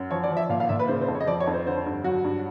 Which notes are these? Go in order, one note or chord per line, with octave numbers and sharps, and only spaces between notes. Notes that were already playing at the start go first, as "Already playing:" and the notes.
Already playing: F#2
F3 C#5
D5
F3
E5
A#2 F5
F5
A#2 E5
B4
C#3 C5
C5
F2
C#5
D#5
F3 D5
C#5
F2
C5
D3 C5
G2
F#3 F#4
G2